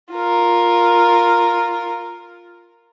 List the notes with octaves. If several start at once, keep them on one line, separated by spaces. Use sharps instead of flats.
F4 A#4